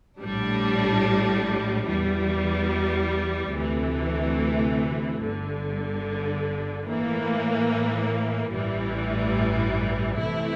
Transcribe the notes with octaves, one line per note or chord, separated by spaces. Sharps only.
A#1 A2 G3 D4
E2 E3 G3
D2 C3 E3 A3
G1 G2 D3
A2 E3 A#3
A1 G2 E3 G3
C3 E3 A3 E4